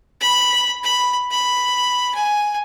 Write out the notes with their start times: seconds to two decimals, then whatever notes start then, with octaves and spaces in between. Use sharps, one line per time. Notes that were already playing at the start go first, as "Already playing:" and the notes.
0.21 B5
0.84 B5
1.31 B5
2.14 G#5